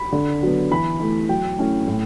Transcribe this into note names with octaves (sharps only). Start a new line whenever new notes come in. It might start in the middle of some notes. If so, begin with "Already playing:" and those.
Already playing: B5
D3
F#3 B3
E3 B5
A3 E4
F#3 G5
A3 C#4 E4
A2